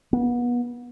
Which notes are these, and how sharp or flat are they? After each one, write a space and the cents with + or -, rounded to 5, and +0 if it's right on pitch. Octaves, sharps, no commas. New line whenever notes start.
B3 -30